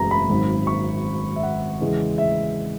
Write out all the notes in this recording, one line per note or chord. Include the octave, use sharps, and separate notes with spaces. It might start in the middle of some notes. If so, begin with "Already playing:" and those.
Already playing: F#1 E2 B2 G#3 A#5
B5
G#1 G#2 F#3
C#6
E5
F#5
E2 C#3 E3 G#3
E5